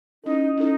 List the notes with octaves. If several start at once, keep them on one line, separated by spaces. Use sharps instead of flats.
C#4 D#4 E4 A4
C#4 D#4 E4 A4